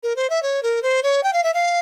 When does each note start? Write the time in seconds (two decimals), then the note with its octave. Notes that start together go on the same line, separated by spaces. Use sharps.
0.03 A#4
0.16 C5
0.30 E5
0.43 C#5
0.63 A#4
0.83 C5
1.03 C#5
1.23 G5
1.33 F5
1.44 E5
1.54 F5